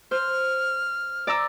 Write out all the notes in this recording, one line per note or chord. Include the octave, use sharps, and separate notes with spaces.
C5 F6
D5 A#5 E6